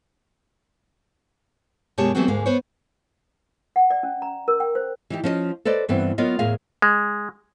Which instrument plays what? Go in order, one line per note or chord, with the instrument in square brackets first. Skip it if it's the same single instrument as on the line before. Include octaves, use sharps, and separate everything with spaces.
[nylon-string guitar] F#2 B2 G#3 G4 C#5 A5
E3 F#3 A3 B3 C4 F#4
D2 G#2 G#3 A#3 F5
B3 C5 C#5
[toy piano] F#5
D5
C#4
A#5
A#4
G5
C5
[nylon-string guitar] E3 D#4 G4
F3 C#4 B4 D#5
A4 B4 C5 D5 D#5
G2 E3 B3 C4
F#3 B3 F4 A#4 C#5 D#5
E2 A2 G#4 A#4 F5
[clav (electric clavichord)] G#3